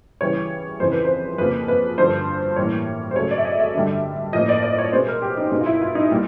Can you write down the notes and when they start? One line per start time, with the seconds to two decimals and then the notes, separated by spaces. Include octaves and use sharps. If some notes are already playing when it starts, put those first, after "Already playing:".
0.21 C#3 E3 G3 B3 C#5
0.80 F2 C#3 E3 C5
0.92 B4
1.05 C5
1.38 F2 C#3 F3 A#3 B4
1.68 B4
1.98 G2 D3 F3 C5
2.56 A2 E3 G3 A#3 C#5
3.11 C5
3.16 C#3 F#3 A3 C#5
3.31 D5
3.38 E5
3.45 D#5
3.60 E5
3.74 G2 D3 G3
4.33 A2 F3 A#3 D#5
4.49 D5
4.63 D5
4.78 C#5
4.93 B2 G#3 B3 C5
5.08 A#4
5.22 G4
5.37 D#4
5.52 B2 G#3 B3 D#4
5.61 F4
5.66 E4
5.82 F4
5.95 D#4
6.11 A#2 G3